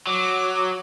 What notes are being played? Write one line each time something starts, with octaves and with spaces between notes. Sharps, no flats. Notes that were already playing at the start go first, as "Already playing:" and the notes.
F#3 D6